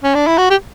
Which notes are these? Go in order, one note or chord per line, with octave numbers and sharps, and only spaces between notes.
C#4
D4
E4
F#4
G4